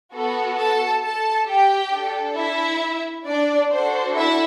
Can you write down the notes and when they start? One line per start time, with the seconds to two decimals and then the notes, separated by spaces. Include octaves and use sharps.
0.13 B3 F#4 A4
0.58 A4 A5
1.03 A4 A5
1.47 G4 G5
1.93 D4 A4
2.36 E4 E5
3.26 D4 D5
3.71 D4 F#4 A4 C5
4.15 E4 E5